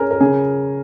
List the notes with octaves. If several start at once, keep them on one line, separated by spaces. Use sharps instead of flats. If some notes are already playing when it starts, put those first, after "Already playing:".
Already playing: C#4 G#4 A#4
A#4
C#3 G#4